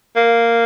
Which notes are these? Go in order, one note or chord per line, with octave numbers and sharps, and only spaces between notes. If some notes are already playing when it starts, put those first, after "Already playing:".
A#3